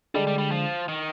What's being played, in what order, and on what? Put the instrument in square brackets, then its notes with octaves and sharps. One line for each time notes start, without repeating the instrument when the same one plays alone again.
[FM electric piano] D3 G#3 D4 [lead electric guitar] G3
[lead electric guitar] G3
G3
F3
D#3